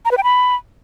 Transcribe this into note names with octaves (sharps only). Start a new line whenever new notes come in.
A#5
B4
G5
B5